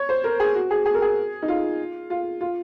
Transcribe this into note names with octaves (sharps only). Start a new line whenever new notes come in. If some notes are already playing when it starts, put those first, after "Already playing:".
Already playing: C#5
C5
A#4
G#4
F#4
G#4
G#4
A#4
G#4
D#4
F4
F4
F4